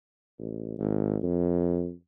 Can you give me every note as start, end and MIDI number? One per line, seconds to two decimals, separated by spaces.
0.39 0.74 33
0.78 1.17 32
1.23 1.92 41